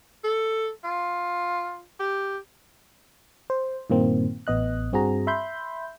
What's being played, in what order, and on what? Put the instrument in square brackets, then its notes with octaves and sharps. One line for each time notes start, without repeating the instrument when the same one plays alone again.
[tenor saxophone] A4
F4
G4
[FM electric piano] C5
G2 A#2 D#3 A#3 C4
A1 B3 D#5 F#6
G2 C4 F#4 G#4 A#5
E5 B5 C6 G6